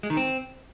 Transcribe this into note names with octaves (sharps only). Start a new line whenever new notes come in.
G#3
D#3
C4